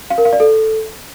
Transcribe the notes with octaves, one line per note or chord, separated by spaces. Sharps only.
F5
A#4
F5
D5
A4